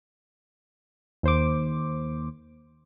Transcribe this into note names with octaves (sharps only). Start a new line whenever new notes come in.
D#2 C5 D6